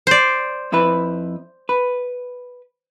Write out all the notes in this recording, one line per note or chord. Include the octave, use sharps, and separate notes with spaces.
C5 D5
F2 E4 B4
B4